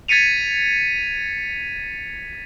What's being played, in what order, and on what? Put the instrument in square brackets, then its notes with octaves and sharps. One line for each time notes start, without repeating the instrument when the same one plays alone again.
[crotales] G#6 A6 B6 C#7 D#7 F7